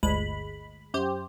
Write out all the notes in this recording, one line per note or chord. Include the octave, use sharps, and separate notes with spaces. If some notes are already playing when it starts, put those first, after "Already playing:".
G1 D2 G#3 B5
F#2 G4 C5